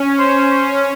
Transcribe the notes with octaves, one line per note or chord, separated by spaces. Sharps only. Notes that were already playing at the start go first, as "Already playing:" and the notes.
Already playing: C#4
C5
C#4